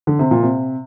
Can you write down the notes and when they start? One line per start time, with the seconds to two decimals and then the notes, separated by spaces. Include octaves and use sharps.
0.07 D3
0.19 C3
0.31 A#2
0.43 C3